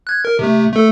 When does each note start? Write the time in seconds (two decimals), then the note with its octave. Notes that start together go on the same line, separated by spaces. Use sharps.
0.07 F#6 G#6
0.25 A#4
0.39 C3 A3
0.73 A3 A4